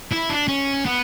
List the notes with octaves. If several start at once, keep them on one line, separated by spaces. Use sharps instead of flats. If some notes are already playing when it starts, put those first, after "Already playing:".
E4
D4
C#4
B3